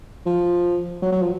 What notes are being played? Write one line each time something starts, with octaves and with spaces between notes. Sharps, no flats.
F3
F#3
F#3
F3